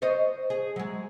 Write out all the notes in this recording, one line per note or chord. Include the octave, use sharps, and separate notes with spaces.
C5 C#5 D#5
G#4
F#3 G#3